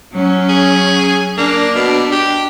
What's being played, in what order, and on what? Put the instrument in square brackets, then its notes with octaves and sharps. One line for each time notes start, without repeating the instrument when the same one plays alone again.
[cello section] F#3 C#4
[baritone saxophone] G#4
[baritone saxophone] A#3 [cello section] D4
[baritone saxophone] B2
G4